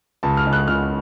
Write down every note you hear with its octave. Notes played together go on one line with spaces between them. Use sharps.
C#2 A5
F6
C#3 G#3
F#6
C#2 F6